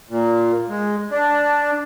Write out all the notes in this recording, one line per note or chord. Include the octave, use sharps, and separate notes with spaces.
A#2
G#3
D4